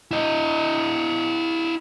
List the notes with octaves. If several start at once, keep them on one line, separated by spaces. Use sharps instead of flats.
E4 D#5